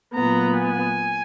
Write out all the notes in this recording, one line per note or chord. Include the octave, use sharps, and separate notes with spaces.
A#2 F#3 B3 A#5
G#5